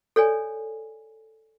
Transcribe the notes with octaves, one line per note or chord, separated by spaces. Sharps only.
A4 C#5 D5 G#5